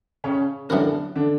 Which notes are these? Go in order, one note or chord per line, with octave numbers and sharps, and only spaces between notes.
C#3 C#4
F#2 D3 E3 B3 D4 E4 A#4
D3 D4